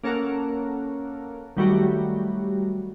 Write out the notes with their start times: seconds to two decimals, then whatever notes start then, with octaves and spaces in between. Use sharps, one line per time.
0.03 A#3 C#4 A4 A#4 F#5
1.57 D#3 F#3 G3 A3 F#4